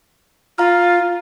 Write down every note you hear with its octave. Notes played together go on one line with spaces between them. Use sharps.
F4 F5 A#5 F6